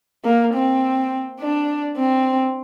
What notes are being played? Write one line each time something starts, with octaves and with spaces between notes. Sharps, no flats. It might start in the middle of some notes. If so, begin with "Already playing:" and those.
A#3
C4
D4
C4